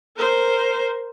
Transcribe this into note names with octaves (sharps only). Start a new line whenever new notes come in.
A#4 C5